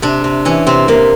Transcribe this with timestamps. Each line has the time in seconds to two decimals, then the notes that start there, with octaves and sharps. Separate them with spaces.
0.02 C3 D4
0.24 C3
0.45 E3 C#4
0.67 C3 C4
0.88 C3 A#3